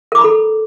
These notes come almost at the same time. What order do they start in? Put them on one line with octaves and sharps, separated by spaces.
A#4 D6 A#5 B5 A4